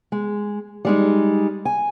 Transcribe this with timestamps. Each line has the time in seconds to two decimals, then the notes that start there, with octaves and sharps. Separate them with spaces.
0.12 G#3
0.85 G3 G#3 D#4
1.65 G#5